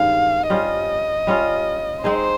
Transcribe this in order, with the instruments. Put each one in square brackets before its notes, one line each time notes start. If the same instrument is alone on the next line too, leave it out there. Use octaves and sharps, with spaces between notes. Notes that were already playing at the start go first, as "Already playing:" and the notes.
Already playing: [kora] G2 D#3 G#3 C#4 [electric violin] F5
[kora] G3 C#4 F4 C5 [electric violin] D#5
[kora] G3 C#4 F4
[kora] G#3 C4 D#4 G#4 [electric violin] C5